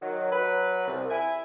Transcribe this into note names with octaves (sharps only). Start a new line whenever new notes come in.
D#3 F#3
F#3 B4
C2
E4 G#5